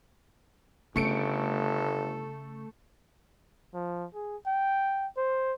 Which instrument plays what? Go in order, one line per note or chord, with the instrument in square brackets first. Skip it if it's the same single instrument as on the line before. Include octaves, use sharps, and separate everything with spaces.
[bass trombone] G1 [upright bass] C#3 [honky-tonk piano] A3 C#7 D7 [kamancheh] A4
[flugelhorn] F3
G#4
G5
C5